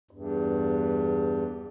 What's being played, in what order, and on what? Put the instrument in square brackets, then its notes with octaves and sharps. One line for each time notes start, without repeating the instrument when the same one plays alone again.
[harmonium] E2 G2